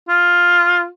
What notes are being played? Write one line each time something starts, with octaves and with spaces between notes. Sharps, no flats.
F4